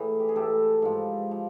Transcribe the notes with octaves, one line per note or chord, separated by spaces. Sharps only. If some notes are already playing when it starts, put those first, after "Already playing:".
Already playing: A2 E3 G#4 A#4
G4
G#4
A2 E3 G4 A4
G#2 F3
F3